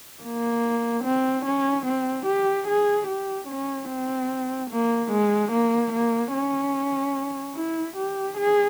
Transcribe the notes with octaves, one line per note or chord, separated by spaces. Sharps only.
A#3
C4
C#4
C4
G4
G#4
G4
C#4
C4
A#3
G#3
A#3
A#3
C#4
E4
G4
G#4